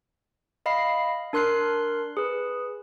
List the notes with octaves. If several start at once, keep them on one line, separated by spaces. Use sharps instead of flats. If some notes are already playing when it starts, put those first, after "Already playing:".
D#5 F5 B5 C7
D4 A#4 C6 F#6 C7
G#4 B4